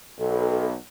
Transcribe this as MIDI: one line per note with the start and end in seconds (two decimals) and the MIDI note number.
0.18 0.74 35
0.18 0.65 69